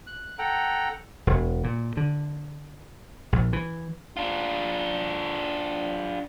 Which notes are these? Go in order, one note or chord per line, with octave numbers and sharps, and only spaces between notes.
F#6
A4 F#5 G5 A#5
E1
A#2
D3
A#1
E3
D4 F4